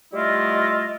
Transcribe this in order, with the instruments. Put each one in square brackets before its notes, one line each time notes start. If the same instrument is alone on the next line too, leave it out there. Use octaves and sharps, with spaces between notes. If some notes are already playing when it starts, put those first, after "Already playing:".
[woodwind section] G3 A3 E4 F4 D#5